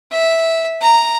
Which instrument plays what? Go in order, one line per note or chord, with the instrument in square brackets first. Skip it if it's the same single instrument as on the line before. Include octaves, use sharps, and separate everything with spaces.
[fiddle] E5
A#5